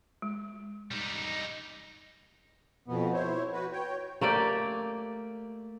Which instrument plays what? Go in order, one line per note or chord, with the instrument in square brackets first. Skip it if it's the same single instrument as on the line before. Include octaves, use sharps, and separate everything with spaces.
[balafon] G#3
[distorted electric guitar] G3 D#4
[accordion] F2 B2 B3
E4 C5 C#5
F#4 B4
C#5 G5
[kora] A3 A#3 G4 D5